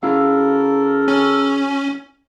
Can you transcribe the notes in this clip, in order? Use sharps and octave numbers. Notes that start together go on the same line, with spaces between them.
C#3 E4 F#4 A4 A#4 F5
C#4